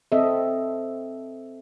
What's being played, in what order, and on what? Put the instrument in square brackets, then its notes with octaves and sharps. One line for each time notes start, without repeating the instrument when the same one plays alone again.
[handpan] C4 A4 D#5 E5